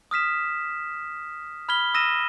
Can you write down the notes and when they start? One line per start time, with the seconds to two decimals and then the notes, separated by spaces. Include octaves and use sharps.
0.11 D#6 F6 B6 E7
1.69 B5 F6 G#6 B6 G7
1.94 D#6 E6 A#6 D#7 E7